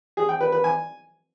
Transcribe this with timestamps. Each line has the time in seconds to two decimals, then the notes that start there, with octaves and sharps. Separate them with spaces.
0.17 G#4
0.29 G5
0.41 B4
0.52 B4
0.64 G#5